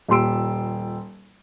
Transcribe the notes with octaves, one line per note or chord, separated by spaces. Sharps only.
D#1 A#2 G4 C6 E6 D7